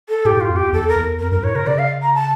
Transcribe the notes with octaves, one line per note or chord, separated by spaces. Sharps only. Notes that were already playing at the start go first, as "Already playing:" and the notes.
A4
A2 G4
A2 F4
F2
E2 G4
E2 A4
A#4
E2
F2 A#4
G2 A#4
A2 C#5
C#3 A#4
C#3 D5
F5
A#5
A5